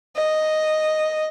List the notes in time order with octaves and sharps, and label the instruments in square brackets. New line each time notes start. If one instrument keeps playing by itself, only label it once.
[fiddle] D#5